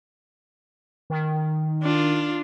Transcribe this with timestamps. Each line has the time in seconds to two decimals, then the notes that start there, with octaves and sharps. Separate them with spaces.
1.10 D#3
1.83 D4 F4